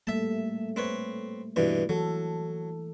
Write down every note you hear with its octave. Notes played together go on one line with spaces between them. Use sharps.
G3 A3 A#3 E5 A5
C4 B4 C#5
G2 B2 E3
E3 F#3 A4